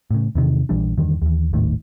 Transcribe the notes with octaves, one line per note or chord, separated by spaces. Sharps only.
A2 C#3
E2 C3 D#3
A#1 E3 G3 D4
E2 G2 D3 D#3
D#2 E3
G#1 D#2 A2 D#3